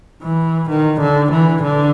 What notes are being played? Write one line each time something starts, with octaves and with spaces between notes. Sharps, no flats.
E3
D#3
D3
E3
D3